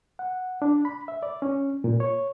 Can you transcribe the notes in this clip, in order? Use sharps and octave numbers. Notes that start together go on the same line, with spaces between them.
F#5
D4
B5
E5
D5
C#4
A#2
C#5